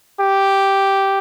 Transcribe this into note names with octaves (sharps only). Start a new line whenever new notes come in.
G4